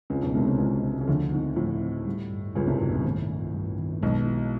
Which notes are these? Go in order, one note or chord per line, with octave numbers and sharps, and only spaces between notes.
C#2 C#3 C4
B1 B2
C2 C3 G#3
C#3
C2 C3
C#2 C#3 G#3
C4
C#3
D2 D3 F3
G#2 C4
A2 F3
C4
G3
G2
C#2 C#3 G3
C2 C3
B1 G2 B2
A#1 A#2
A2 D#3
G2
G2
D#3
B1 B2 G#3
E4